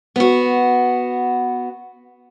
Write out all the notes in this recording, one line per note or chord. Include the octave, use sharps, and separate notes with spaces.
B3 F#4